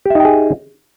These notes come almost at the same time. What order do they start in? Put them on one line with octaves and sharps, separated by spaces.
G4 E5 D#4 G5 G#4